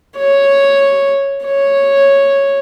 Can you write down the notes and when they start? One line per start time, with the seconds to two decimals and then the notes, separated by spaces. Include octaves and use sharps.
0.18 C#5
1.45 C#5